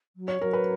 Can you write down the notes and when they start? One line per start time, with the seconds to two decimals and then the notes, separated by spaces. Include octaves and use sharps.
0.16 F#3
0.28 C#5
0.41 F#3 A#4
0.53 B4